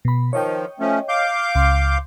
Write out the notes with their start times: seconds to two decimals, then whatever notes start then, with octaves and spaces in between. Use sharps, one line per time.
0.05 B2 B5
0.33 D#3 F3 C#5 D#5 G5
0.80 F3 A3 C#4
1.09 F5 D6 G6
1.55 C#2 C6